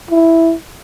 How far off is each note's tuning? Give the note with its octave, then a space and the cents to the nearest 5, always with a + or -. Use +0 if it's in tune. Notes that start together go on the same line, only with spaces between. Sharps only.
E4 +0